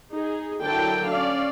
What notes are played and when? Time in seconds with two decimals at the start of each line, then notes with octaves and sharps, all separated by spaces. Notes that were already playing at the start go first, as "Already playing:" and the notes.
0.14 D#4 G#4
0.61 D3 F#3 E4 A#4 G5 A5
1.07 C#4 D5 F5